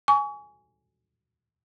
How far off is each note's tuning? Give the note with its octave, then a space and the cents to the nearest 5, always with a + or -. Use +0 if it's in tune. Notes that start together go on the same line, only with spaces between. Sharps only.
G#5 +0 C#6 +35